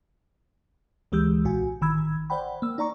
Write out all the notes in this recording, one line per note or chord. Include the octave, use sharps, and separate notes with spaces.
D2 E3 G#3 G4 E6 G6
B1 A#2 F#4 G#5
A1 D#3 B5 E6 G#6
C5 D5 F#5 G5 B5
A#3 E6
D#4 D5 A#5 C#6